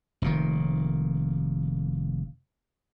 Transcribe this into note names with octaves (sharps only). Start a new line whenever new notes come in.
F1 A#2 D#3